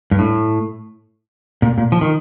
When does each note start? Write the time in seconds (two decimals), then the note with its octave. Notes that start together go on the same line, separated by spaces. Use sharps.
0.11 G2
0.19 A2
1.62 A#2
1.78 A#2
1.92 F3
2.01 D#3